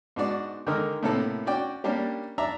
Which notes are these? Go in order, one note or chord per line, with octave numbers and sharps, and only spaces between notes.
G#2 B3 D4 F#4 D5
D3 D#3 G#3 A#4 E6
A2 C3 A#3 B3 A4
C#4 F#4 D5 G5
G3 A#3 C#4 D4 G4
D4 D5 E5 A#5